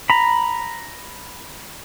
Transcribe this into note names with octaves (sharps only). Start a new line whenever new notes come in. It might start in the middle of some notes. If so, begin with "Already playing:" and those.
A#5 B5